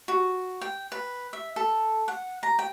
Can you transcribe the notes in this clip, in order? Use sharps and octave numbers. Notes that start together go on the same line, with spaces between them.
F#4
G5
B4
E5
A4
F#5
A#5
G5